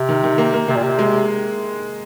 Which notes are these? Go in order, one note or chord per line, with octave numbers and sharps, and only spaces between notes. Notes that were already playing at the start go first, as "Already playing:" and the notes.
Already playing: C3
D#3
D#3
A#3
A#3
C3 A#3
A#2
C3
G#3